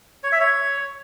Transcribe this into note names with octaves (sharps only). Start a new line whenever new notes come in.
C#5
E5
C#5